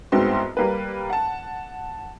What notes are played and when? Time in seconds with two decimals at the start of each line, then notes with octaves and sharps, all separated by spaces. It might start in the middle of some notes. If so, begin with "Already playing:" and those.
0.12 C2 G#2 B3 C4 F#4 C6
0.57 G3 A#3 B4
1.10 F#5 A5